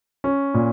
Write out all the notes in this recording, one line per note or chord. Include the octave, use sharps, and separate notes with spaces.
C#4
A#2